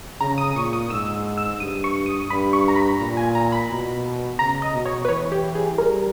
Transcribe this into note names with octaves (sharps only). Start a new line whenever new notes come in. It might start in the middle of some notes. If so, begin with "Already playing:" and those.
C#3 A#5
D#6
A#2 C#6
D#6
G#2 E6
E6
G2 D#6
C#6
D#6
G2 B5
C#6
A#5
B5
A#2 A#5
G#5
A#5
B5
B2
C#3 A#5
D#5
B2
C#5
B4
E3 C#5
G4
G#4
G3 A#4